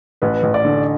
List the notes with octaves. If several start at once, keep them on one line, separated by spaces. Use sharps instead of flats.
A1 B4
A1
D5
D3